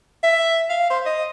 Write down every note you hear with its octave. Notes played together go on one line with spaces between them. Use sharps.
E5
F5
C5
D#5